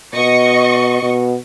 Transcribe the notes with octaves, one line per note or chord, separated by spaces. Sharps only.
B2 D#5 C#6 C#7
B2